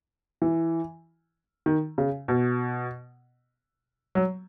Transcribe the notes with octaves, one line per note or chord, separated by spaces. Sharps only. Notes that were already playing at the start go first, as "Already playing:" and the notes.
E3
D#3
C#3
B2
F#3